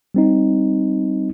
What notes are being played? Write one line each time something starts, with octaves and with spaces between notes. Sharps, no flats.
G3 C4 D#4